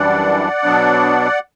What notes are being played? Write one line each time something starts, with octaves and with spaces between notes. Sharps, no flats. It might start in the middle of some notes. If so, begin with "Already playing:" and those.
Already playing: F#2 E3 G3 D4 D5 F#5
B2 F#3 B3 D4